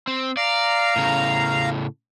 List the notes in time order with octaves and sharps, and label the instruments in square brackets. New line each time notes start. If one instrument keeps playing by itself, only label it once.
[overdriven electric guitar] C4
[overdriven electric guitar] D5 [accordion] F5 A#5
[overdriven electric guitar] A2 C#3